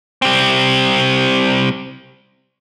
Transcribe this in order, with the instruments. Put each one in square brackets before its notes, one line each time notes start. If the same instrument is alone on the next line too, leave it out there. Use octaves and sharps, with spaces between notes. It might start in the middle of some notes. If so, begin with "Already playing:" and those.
[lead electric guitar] G3 C4